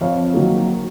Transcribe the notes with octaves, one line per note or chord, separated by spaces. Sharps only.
F2 C#5 F5
D#3 F#3 A#3